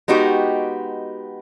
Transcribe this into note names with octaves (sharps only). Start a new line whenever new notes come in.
G#3 B3 D#4 F#4 G4